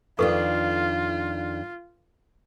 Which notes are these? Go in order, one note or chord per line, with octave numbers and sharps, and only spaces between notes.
F2 D#3 D4 F4 A4 B4 C#6